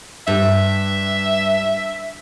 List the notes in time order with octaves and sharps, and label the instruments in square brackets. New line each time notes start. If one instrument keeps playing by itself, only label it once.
[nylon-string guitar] G2 [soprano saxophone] E5